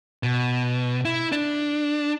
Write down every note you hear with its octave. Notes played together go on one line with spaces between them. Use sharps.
B2
E4
D4